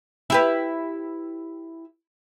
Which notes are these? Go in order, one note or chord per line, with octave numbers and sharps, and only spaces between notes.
E4 G4 B4